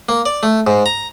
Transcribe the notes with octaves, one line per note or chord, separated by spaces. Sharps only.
A#3
D5
A3
G#2
A#5